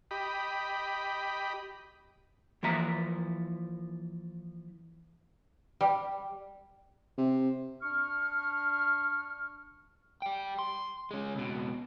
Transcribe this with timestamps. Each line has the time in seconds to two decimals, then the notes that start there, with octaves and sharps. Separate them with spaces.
0.11 G4 D#5 B5
2.63 E3 F3 A#3 E5 A#5
5.81 G3
7.18 C3
7.82 D4 C#6 F6
10.22 G3 G5
10.59 C6
11.11 G#3 C#4
11.35 C#2 B2